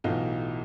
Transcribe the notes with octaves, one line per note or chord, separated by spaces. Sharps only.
B1 A2 E3 D#4 F4